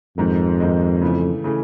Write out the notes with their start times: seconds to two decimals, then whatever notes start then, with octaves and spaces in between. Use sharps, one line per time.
0.18 F2 G#2 D#3 G#3
0.60 G#2 D#3 G#3
1.02 C#3 E3 A3
1.44 C#3 E3 A3